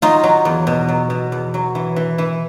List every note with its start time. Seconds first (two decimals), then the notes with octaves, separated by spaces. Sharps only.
0.02 F#3 D#4 F4
0.24 F#3
0.45 E2
0.67 B2
0.88 F#3
1.10 B2
1.32 E2
1.54 F#3
1.75 E3
1.96 E3
2.18 E3